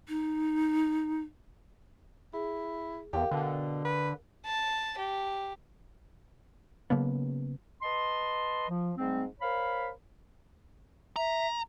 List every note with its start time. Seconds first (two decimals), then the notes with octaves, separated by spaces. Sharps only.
0.08 D#4
2.34 E4 G#4
3.13 E2 G4 A#4 F5 G5
3.31 B2 D3
3.85 B4
4.45 A5
4.98 G4
6.90 C#3 F#3 A#3 B3
7.82 B4 D#5 A5 C6
8.69 F3
8.97 G#2 G3 A3 C4
9.40 A#4 C5 C#5 F5 B5
11.16 E5 A#5